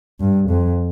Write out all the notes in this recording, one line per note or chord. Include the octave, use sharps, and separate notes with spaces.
G2
F2